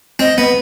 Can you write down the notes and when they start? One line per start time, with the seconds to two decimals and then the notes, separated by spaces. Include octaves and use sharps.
0.19 C4 D#5
0.38 B3